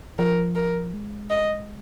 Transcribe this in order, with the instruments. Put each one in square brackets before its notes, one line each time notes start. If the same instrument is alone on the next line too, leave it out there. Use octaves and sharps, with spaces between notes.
[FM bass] F3 [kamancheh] A#4
[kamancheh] A#4
[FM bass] G#3
[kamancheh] D#5